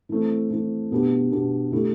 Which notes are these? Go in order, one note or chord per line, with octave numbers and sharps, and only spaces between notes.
E3 A3 C4
E3 A3 C4
B2 B3 D4 G4
B2 B3 D4 G4
D3 A3 E4 G4